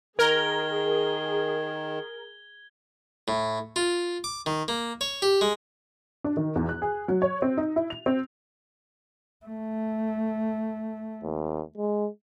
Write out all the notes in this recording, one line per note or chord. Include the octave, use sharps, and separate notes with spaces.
D#3 G#4 A#4 G#6 G7
A2
F4
D6
D#3
A#3
C#5
G4
G#3
D4
D#3
E2
F#6
G#4
F#3
C#5
C4
D#4
E4
F7
C4
A3
D#2
G#3